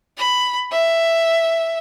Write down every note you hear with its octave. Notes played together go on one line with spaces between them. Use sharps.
B5
E5